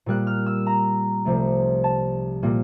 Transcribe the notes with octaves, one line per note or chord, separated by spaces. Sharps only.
A#2 G3 A#3 F#6
F6
E6
A#5
C2 C3 F3 A3
A5
A#2 G3 A#3